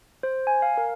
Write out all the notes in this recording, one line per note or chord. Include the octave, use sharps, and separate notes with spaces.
C5
G#5
F5
A#4